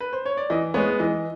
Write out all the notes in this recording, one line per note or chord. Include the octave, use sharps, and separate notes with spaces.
B4
C5
C#5
D5
E3 D#5
G#3 B3 C#5
E3 D#5